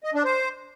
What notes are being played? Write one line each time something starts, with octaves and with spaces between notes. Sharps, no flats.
D#5
D4
C5